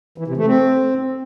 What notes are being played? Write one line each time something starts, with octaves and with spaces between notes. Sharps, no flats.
E3
C3
A3
C4